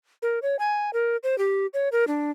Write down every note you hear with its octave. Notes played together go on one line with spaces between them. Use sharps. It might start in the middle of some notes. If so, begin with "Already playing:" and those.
A#4
C#5
G#5
A#4
C5
G4
C#5
A#4
D4